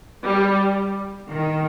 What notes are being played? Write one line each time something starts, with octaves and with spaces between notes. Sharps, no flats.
G3
D#3